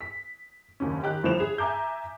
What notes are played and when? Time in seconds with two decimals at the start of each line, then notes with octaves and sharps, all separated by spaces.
0.01 B6
0.80 F#1 D#2 C#4
1.02 D#3 G4 F#6
1.23 G1 F3 C5 E7 F7
1.40 G#4
1.58 E5 G#5 A#5 D6 G6